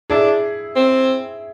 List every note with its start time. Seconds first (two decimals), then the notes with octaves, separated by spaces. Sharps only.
0.10 D4 E4 G#4
0.76 C4